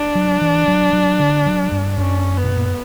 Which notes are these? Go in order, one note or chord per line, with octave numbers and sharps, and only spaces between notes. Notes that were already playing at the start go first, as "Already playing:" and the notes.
Already playing: D4
F#3
E3
F#3
F#3
D3
F#3
G2
F#2 C#4
B3
B2
A#2